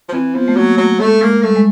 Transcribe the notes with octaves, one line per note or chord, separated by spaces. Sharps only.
F3
E3 C4
F3 B3
A3
F#3 A#3
F#3 A3
G#3 A3
G#3 A#3
G3 A3
G#3